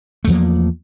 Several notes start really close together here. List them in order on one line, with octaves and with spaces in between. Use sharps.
A3 E2 F3 A#3